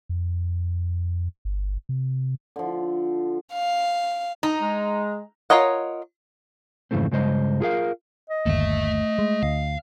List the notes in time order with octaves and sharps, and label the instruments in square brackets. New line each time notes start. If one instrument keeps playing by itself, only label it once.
[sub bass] F2
G1
C3
[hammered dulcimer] D3 F3
[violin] F5
[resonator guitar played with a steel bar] D#4 [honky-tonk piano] A#5
[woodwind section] G#3
[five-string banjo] F4 A#4 C#5 D#5 F#5
[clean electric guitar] F2 G#2 C#3 E3 A3 C4
G2 C#3 G#3 C5 D#5
F4 G#4 A#4 F5
[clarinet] D#5
[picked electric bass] G1 D#2 [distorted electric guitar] A3 E5
[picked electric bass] G#3
[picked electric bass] D2 [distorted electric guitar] F5